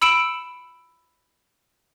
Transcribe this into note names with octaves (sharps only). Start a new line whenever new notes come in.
B5 E6 C#7 D7 E7 F#7